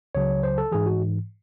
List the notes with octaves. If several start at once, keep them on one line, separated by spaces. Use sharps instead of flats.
C#2 C#3 F#3 C#5
C5
A4
G#2 E3 G#4
F#4